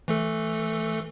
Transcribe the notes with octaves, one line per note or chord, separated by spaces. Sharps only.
E3 A3 A4